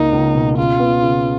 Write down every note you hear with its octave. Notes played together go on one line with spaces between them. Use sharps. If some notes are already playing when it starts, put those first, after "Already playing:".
Already playing: C#2 A#3 D#4
C#2
B2
C#3 F4
B3
C#3